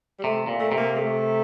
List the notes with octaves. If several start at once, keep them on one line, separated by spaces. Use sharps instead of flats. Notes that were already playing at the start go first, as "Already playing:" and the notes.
G3
C3 A3
A#2
A3
C3
A#3
A3